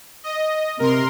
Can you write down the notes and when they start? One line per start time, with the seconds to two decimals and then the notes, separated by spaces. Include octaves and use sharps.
0.24 D#5
0.79 C3 A#4 C6